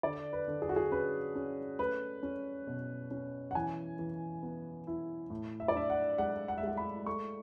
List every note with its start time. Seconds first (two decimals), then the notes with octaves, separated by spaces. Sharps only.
0.03 D3 D5
0.33 B4
0.48 D3
0.62 G#4
0.69 F#4
0.76 G#4
0.91 C#4 B4
1.35 C#4
1.79 A3 B4
2.23 C#4
2.67 B2
3.11 C#4
3.51 F#5
3.55 E3 G#5
3.99 E3
4.43 B3
4.87 E4
5.30 A2
5.60 E5
5.68 D5
5.75 D4 E5
5.90 F#5
6.18 G#3 F#5
6.48 F#5
6.58 E5
6.63 G#3 F#5
6.77 B5
7.06 A3 C#6